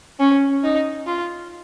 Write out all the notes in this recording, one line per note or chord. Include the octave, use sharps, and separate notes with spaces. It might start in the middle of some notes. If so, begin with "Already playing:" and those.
C#4
D#4
F4